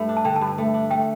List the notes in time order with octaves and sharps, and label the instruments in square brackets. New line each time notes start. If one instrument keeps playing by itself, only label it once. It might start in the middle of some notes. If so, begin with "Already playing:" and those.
Already playing: [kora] G2 A3
D4
[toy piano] A5
[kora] D3 [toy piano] G5
[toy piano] A5
[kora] G2
[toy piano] A5
[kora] A3
D4
[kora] A3 [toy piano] G5